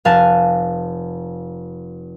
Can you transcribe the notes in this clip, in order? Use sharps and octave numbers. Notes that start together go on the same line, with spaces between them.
F1 F5 G#5 A5 F#6